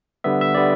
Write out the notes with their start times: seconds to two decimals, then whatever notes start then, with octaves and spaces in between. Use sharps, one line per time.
0.24 D3 G3 B3 E5
0.41 E5
0.55 D3 G3 B3 D5